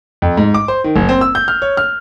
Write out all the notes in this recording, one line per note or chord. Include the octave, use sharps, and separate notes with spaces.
F2
G#2
D6
C5
D#3
F#1
C4
E6
G6
F6
C#5
F6